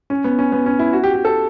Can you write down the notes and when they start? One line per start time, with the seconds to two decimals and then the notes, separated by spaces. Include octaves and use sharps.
0.10 C#4
0.24 B3
0.39 C#4
0.52 B3
0.66 C#4
0.79 E4
0.93 F#4
1.04 G4
1.14 G4
1.25 A4